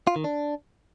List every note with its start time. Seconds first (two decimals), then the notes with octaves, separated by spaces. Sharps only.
0.07 F4
0.16 D#3
0.24 D4